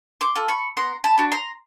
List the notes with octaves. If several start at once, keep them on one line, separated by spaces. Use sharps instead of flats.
C6 D6
F4 A4
B5 C#6
B3 A#5 C6
A5 B5
D4 F#4
A#5 C6